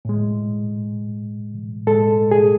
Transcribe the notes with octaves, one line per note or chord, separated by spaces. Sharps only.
A2 G#3
A2 G#3 A4
G#4